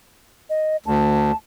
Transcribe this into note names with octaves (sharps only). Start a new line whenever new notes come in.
D#5
D2 A5